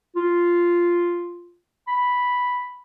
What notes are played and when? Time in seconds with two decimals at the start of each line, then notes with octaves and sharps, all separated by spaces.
0.16 F4
1.87 B5